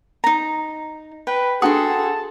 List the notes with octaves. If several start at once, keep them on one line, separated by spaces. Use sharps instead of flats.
D#4 A#5
B4 G5
D4 F#4 G#4 A4 G5 A5 C6 D#6